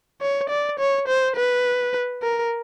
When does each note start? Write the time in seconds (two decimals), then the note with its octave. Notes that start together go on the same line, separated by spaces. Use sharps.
0.21 C#5
0.50 D5
0.79 C#5
1.08 C5
1.36 B4
2.23 A#4